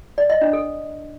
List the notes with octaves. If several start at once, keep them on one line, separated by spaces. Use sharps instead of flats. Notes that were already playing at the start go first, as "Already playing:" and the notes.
D5
D#5
D4
A4